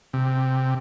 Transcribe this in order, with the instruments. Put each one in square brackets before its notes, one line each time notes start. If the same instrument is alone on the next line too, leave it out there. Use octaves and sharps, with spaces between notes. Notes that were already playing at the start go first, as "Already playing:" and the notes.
[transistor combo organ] C3